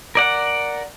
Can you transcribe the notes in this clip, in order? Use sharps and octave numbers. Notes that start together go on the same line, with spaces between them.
A#4 D5 F#5